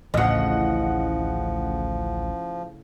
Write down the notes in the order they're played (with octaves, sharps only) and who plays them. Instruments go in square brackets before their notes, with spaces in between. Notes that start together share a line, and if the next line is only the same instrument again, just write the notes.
[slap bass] A1 D2 [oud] A2 C#3 [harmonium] F3 [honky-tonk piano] D#5 F#5